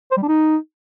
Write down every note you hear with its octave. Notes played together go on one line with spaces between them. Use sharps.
C5
G3
D4
D#4